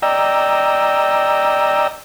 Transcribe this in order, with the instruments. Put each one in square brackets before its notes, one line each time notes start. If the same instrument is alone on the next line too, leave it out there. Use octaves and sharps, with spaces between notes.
[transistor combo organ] D5 D#5 G5 A#5 E6